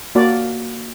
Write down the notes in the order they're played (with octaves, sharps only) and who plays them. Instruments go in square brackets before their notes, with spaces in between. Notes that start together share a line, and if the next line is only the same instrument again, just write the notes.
[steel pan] A#3 F#4 D5